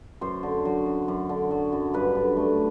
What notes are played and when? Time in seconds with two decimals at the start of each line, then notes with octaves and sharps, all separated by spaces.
0.21 F#2 C5
0.43 D3
0.65 F#3
0.86 F#2
1.08 F#2
1.29 D3
1.51 F#3
1.72 F#2
1.94 G2 B4
2.15 D3
2.37 A3